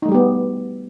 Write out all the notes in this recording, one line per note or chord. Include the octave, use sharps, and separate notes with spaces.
G3 A3 B3 D#4 G4